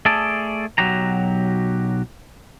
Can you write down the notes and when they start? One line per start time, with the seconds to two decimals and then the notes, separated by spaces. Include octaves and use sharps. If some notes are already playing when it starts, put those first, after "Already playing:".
0.06 A3 G#4 A4 D5
0.78 B1 F#3 F#4 G4 A#5